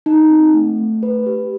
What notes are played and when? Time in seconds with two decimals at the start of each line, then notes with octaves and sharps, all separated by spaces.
0.06 D#4
0.30 C4
0.54 A3
0.78 A3
1.03 B4
1.26 G4